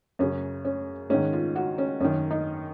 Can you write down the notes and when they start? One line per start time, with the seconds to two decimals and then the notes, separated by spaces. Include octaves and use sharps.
0.19 F#2 C#3 C#4
0.65 C#4
1.10 G#2 D#3 C#4
1.33 F4
1.56 F#4
1.78 C#4
2.00 F#2 D#3 C#4
2.31 D#4